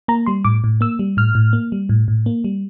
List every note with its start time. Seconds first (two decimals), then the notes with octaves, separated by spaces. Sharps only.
0.08 A#3 A#5
0.26 G3 C6
0.45 A2 D6
0.64 A2
0.81 A#3 E6
0.99 G3
1.17 A2 F6
1.35 A2
1.53 A#3
1.72 G3
1.89 A2
2.08 A2
2.26 A#3
2.44 G3